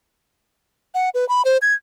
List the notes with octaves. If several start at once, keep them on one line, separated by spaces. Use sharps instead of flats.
F#5
B4
B5
C5
G#6